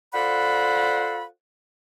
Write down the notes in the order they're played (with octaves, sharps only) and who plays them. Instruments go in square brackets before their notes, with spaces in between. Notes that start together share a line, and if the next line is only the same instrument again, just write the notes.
[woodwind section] F4 A4 C5 D5 F#5 B5